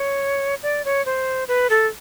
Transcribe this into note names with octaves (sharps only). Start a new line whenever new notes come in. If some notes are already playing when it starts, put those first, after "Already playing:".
Already playing: C#5
D5
C#5
C5
B4
A4